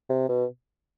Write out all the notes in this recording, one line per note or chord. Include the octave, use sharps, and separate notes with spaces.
C3
B2